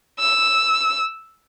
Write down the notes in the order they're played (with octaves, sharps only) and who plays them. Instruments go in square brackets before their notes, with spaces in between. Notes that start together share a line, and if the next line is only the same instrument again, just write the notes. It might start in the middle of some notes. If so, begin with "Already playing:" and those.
[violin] E6